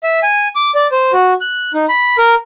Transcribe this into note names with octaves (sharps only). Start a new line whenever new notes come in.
E5
G#5
D6
D5
C5
F#4
F#6
D#4
B5
A#4